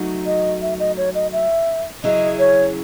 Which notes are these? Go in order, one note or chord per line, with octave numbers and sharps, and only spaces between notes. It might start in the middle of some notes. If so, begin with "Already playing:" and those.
Already playing: F#3 A3 D#4 F#4
D#5
E5
D#5
C#5
D#5
E5
C#3 F#3 C#4 E4 G#4 D#5
C#5